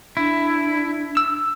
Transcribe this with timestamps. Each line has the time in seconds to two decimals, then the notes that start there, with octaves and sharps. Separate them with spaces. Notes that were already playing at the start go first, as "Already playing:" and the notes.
0.17 D4 E4
1.17 E6